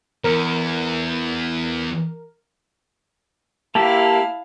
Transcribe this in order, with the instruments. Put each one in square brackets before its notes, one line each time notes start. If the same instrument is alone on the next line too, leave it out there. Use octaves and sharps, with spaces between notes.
[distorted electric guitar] E2 [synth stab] A#4
[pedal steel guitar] A#3 G4 E5 [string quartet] E4 F5 [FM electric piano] A5